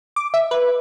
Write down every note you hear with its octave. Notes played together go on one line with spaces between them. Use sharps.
D6
E5
B4